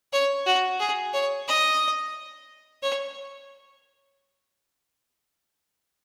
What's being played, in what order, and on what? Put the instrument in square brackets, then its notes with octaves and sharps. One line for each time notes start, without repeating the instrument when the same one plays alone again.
[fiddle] C#5
F#4
G#4
C#5
D#5
C#5